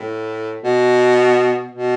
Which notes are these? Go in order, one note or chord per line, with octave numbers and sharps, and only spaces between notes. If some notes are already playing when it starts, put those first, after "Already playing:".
Already playing: A2
B2
B2